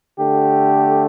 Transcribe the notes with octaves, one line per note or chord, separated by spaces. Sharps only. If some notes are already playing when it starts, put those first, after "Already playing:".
D3 A3 G4